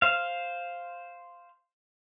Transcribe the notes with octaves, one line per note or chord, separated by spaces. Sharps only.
C5 F5